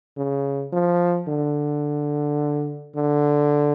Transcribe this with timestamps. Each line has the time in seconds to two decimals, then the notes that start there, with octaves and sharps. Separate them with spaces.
0.17 C#3
0.72 F3
1.28 D3
2.96 D3